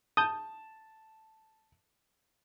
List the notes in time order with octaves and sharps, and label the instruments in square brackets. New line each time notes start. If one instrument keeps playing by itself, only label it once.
[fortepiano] A5 [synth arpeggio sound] D#6 G6